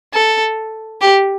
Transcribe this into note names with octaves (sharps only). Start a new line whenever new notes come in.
A4
G4